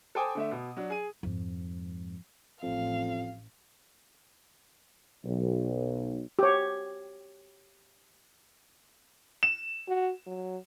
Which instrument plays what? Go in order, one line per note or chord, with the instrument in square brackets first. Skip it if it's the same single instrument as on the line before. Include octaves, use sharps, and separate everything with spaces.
[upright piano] A4 C5 G5 G#5 D6 D#6
D3 A3 E5
B2
F#3 D4
G#4 D#7
[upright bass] F2 G#2
[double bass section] A1 [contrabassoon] F2 [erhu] F5
[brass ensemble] B1
[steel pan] G4 C#5
[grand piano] E7
[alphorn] F#4
F#3